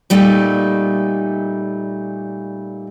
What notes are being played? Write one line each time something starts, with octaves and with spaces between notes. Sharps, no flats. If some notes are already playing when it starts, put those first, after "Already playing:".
A#2 G3 A3 D#4